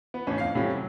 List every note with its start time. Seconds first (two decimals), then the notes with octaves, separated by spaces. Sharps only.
0.14 B3
0.27 A1 C#4 D4
0.38 F2 F5 C7
0.55 A2 C3 G3 C#4
0.75 F#3